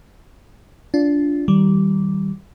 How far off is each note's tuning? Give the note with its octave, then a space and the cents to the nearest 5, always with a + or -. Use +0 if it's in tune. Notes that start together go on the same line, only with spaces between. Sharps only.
D4 -20 F4 +0
D#3 +20 G3 -15